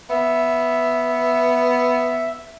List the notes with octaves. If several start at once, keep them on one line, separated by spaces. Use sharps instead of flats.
B3 E5